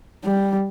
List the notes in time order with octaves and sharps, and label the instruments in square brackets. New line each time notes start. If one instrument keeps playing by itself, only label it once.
[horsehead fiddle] G3